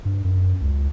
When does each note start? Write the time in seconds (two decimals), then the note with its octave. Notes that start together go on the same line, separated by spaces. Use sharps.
0.05 G2
0.25 F#2
0.61 C#2